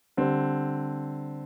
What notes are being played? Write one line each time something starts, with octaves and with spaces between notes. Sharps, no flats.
D3 G3 C4